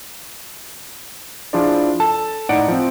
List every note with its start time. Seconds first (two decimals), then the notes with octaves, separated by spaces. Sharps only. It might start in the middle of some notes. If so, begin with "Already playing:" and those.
1.53 F3 D4 E4 F4 G#4 D5
2.00 A4 A5
2.49 A2 D#4 D5 F#5 C#7 D7
2.68 F3 C4